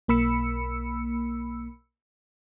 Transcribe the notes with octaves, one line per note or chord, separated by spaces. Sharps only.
B1 A#3 B5 E6 C#7